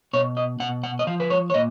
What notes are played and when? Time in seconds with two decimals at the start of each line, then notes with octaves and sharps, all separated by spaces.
0.13 B2 C#5
0.37 D#5
0.60 B2 F#5
0.83 F#5
0.99 D#5
1.07 F3 F5
1.20 B4
1.30 C#5
1.50 C#5
1.54 A#2 D#5